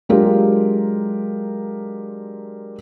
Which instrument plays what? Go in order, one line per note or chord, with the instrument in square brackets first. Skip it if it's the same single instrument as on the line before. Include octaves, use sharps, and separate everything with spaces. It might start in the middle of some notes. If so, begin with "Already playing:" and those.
[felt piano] F#3 G#3 D4 F4 G4 A#4